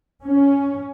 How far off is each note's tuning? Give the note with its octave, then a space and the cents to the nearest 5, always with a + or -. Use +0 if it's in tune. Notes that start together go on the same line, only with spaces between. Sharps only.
C#4 +10